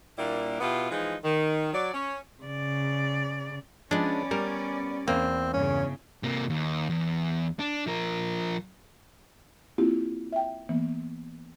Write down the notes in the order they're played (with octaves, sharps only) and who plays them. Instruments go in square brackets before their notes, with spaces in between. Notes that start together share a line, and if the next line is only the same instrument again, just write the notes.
[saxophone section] A#2 G3 A#3 D4 E4
B2 B3 E4 F4 G4
E3 F3 G#3 D#4
D#3
F#3 D5
C#4
[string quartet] C#3 D5
[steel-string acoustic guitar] F3 B3 [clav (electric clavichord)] G#3 D4 [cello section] C#4 D5
[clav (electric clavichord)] G3 A#4 [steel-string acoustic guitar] B3
[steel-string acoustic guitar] E2 [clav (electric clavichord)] A#3 [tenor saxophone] C4
[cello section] G2 C#3 [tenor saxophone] C#4
[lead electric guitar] C3 A#3
D#2
E2
D4
F3 A#4
[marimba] A#3 C4 E4 F4 G4
E5 G5
E3 A#3 B3